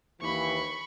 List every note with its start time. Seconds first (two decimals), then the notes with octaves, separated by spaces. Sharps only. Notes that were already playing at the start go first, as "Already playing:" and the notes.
0.21 D#2 E3 B5 C#6